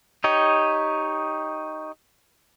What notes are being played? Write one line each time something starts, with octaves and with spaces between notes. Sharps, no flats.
D#4 G4 C#5 D#5